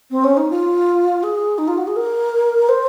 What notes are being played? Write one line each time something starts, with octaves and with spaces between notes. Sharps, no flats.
C4
C#4
D#4
F4
G#4
D#4
F4
F#4
G#4
A#4
C5